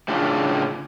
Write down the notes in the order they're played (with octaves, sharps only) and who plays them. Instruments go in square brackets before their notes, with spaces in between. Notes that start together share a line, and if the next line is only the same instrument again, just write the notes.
[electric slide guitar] A2 C#3 D4 F4